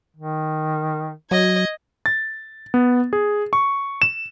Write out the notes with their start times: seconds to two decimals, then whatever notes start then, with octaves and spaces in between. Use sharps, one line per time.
0.16 D#3
1.31 F#3 D#5 G#6
2.06 A6
2.74 B3
3.13 G#4
3.53 C#6
4.02 E7